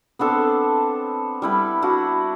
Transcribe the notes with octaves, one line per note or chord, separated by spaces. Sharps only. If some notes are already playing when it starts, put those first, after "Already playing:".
B3 C4 D4 A4
G3 E4 B4
D4 E4 F#4